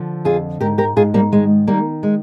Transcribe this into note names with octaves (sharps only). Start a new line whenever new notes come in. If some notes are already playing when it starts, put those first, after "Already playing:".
Already playing: D3 F3
F2 F4 G#4
G#2 G4 A#4
G4 A#4
G#2 F4 G#4
G3 A#3
D#3 G#3
D#3 G3 A#3
G#3